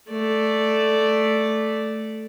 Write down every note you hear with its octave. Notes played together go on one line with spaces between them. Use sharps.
A3 D5